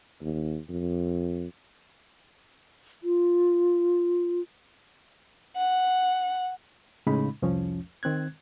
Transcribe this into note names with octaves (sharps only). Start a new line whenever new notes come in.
D#2
F2
F4
F#5
A2 C#3 G#3 C#4 D#4 B5
C2 F2 F3 C#4
D#3 C4 F#6 G#6